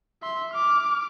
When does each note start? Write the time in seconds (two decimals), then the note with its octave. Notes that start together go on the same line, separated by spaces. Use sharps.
0.23 E5 C6
0.54 D6 F6